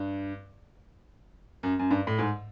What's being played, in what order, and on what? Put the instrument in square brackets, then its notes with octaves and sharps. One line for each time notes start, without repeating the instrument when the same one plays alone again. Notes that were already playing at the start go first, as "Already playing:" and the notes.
Already playing: [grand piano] G2
F#2
F#2
G2
A2
G#2